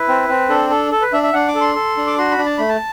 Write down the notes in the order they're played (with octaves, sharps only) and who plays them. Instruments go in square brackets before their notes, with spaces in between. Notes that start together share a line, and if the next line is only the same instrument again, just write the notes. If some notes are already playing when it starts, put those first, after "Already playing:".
Already playing: [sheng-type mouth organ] E4 B4
C4
C4
D4 A4
A4
A4
B4
D4 E5
E5
D4 F#5
D6
A4
C6
A4
D4
D6
F#4 C6
B5
D4
A5
A3 B5
A5